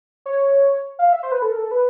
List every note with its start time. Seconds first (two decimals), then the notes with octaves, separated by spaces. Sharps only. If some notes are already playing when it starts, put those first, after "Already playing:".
0.26 C#5
0.99 F5
1.13 E5
1.23 C5
1.32 B4
1.42 A4
1.52 A#4
1.56 A4
1.71 B4